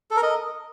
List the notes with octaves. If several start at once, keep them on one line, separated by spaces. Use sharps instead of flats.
A4
A#4
D#5